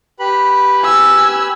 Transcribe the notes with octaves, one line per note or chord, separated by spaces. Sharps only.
G4 B4 B5
G#5 E6